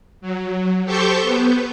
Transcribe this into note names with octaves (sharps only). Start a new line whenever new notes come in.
F#3
G4 A4 C5 C#6 G6
B3